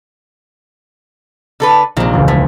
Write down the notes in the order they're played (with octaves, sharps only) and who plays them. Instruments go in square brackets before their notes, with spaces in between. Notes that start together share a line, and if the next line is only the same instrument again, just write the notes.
[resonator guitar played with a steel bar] D3 A4 B4
[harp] A#1 [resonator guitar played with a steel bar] C3 D#3
[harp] E1 C#2
[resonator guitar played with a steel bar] A2 [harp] B6